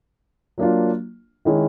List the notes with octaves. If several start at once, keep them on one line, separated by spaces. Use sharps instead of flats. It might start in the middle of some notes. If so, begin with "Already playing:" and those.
F#3 A#3 D4 F4
D#3 G#3 C#4 E4